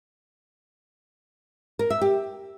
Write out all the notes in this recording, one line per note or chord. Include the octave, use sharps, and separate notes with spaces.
A#4
E5
G4